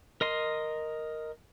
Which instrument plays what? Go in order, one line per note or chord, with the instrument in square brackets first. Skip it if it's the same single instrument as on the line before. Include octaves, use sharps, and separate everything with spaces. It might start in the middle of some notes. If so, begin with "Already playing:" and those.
[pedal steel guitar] A#4 D#5 C6